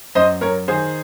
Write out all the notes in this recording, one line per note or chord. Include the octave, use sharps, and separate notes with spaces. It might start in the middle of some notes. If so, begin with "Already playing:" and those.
F#2 C5 D#5
F#2 A#4 C#5
D#3 G#4 C5